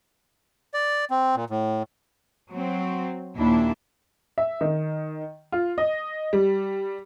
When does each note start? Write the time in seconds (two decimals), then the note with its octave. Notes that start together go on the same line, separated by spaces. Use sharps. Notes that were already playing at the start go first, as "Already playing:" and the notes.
0.74 D5
1.11 C4
1.36 A#2
1.50 A2
2.50 F#3 C4
3.36 D#2 A#2 D4 E4
4.38 E5
4.61 D#3
5.52 F4
5.78 D#5
6.33 G3